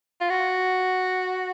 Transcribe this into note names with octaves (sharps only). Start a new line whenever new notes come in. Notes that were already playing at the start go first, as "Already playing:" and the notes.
F4
F#4